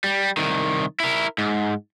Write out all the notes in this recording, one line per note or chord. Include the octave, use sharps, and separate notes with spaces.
G3
C2 D#3
E4 A#4
G#2